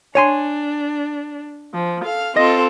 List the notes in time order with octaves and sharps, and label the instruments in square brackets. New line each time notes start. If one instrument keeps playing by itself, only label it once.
[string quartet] D4 [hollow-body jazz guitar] C#5 G#5 C6
[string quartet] F3
A4 F5 F6
[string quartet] C4 F4 A4 [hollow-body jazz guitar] D#5